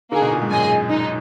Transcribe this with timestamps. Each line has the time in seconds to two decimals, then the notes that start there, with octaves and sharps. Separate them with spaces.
0.12 D3 A#3 D#4 G#4
0.22 B2
0.31 A#2
0.42 G#2
0.50 F#2 G#4 D#5 G#5
0.90 D#4